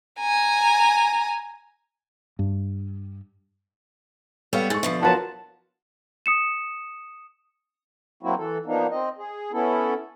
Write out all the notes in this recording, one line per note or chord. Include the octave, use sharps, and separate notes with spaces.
G#5 A#5
G2
G3 B3 A4 C#5 F5
G#2 G#4 A4 C#6 A6
B2 D3 F3 E5
F#3 F4 F#4 A#4 B4 C#5 A5
D#6 C#7 E7
F#3 A#3 C4 E4 F#4
E3 A4
F3 A#3 B3 D4 D#4
C4 D#5
G#4
B3 C#4 E4 A4